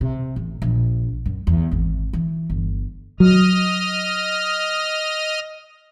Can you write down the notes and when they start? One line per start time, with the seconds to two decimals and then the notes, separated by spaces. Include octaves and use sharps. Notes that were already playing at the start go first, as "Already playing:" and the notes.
0.01 C3
0.36 A1
0.62 A#1
1.26 F#2
1.47 E2
1.71 G#1
2.13 E3
2.50 G1
3.20 F#3 D#5 D#6 F6